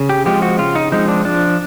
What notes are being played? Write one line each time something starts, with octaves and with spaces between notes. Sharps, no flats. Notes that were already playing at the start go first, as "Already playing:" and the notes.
Already playing: C#3
G4
F3 G#3 C4 G4
F#4
C#3 F4
D#4
F3 G#3 C4 D#4
D4
F3 D4